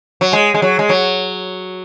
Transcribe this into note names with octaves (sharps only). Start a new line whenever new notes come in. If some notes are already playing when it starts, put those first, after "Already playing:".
F#3
G#3
G#3
F#3
G#3
F#3